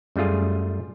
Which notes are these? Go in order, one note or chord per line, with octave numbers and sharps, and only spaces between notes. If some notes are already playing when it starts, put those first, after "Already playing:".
F#2 G3 A3 F4 G#4